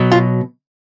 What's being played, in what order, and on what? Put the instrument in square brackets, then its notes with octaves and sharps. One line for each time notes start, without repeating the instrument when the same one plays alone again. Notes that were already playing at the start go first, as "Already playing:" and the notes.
Already playing: [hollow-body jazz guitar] B2 F#3
F4